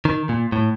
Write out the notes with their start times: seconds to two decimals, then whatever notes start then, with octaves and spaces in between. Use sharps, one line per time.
0.05 D#3
0.29 A#2
0.52 A2